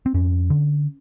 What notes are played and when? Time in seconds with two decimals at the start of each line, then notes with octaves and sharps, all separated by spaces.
0.06 C4
0.14 F2 C#4
0.50 D3